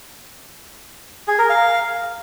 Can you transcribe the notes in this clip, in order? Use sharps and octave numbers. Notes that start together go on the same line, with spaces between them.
G#4
A#4
F5